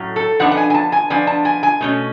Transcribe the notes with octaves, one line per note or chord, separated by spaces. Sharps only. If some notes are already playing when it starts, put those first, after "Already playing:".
Already playing: A2 F#3 A3 C#4
A4
F3 B3 D4 F#5
F#5
G#5
G#5
A5
G#5
F3 B3 D4 G#5
A5
G#5
G#5
B2 A3 C#4